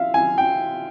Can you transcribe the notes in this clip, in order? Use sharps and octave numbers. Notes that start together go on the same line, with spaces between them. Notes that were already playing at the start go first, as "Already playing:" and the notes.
Already playing: E5 F5
G#5
G5